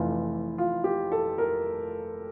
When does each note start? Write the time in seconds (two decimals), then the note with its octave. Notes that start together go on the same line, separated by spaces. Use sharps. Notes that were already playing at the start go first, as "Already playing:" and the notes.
Already playing: F1 F2 E3 F4
0.58 F4
0.84 G4
1.12 A4
1.38 A#4